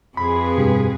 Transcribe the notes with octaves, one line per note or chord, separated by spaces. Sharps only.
F2 C4 G#4 B4 B5
G2 B2 G4